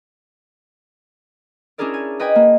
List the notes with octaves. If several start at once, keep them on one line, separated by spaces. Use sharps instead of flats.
C#4 D4 E4 G#4 A#4 D5
G#5
B4 D#5 G5 G#5
A#3